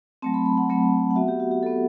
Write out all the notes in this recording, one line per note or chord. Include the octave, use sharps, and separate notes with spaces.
F#3 A3 C4 A5
B5
B5
F#5
F#3 A3 C4
F#5
B3 F#4 E5
G4
F#4
G4
B3 F#4 A4